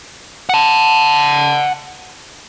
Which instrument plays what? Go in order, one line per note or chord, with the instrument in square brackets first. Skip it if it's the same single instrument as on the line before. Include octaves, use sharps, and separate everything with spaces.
[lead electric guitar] F#5 A5